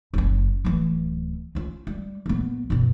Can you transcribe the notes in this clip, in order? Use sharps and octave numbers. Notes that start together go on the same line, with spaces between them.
F#1 C#4
D1 E3
C#4 F4
G3
A#1 B3
F#2 B2